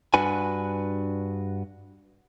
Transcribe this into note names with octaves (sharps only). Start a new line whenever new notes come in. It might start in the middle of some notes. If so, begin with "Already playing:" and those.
G2 D4 F#4 B4 G#5